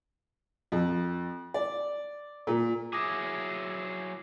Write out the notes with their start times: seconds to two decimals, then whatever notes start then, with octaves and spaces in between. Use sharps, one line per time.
0.72 F2
1.54 D5
2.47 A#2
2.93 F#3 E4 G#4 D6 D#6 A#6